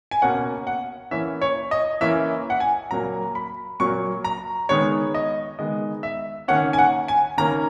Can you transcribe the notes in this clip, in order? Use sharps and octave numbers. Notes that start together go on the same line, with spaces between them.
G#5
B2 A#3 C#4 F#5
F#5
E3 A#3 C#4 E5
C#5
D#5
E3 A#3 C#4 E5
F#5
G#5
A#2 F#3 A#3 A#5
B5
A#2 F#3 A#3 C#6
A#5
D#3 G#3 B3 C#5
D#5
D#3 G#3 B3 D#5
E5
D#3 A#3 C#4 F#5
G#5
F#5
G#5
D#3 A#3 C#4 A#5